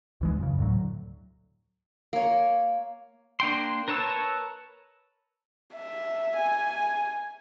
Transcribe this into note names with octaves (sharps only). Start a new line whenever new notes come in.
D2 E3 G#3
F#2 C#3
D2 A2 F#3
A#3 C#5
A#3 D4 G5 C6
A#4 B4 C#5 A5 E6
E5
G#5